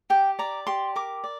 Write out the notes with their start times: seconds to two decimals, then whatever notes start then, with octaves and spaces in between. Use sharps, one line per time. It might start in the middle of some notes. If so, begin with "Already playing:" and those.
0.10 G4 G5
0.39 D5 A#5
0.67 G4 C6
0.96 A#4 D6
1.24 D5